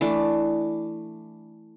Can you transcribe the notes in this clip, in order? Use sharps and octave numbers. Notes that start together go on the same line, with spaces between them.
E3 A3 D4